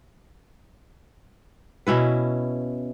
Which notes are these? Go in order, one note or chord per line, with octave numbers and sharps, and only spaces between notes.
B2 C#4 E4 B4